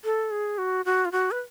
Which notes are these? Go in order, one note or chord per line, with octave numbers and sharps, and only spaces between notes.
A4
G#4
F#4
F#4
F4
F#4
B4